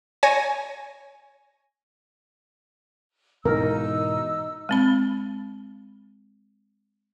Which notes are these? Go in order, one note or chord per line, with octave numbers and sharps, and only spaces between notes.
C#5 G#5 A#6
G#2 B2 E3 D#4 A#4 E6
G#3 C4 B5